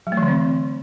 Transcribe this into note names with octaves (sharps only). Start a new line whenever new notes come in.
F#3
A3
E3
D3
C4